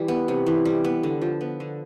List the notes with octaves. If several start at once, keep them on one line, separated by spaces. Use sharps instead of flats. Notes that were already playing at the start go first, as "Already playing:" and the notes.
Already playing: E3 G3
B3
C3
E3
G3
B3
D3
F3
B3
D3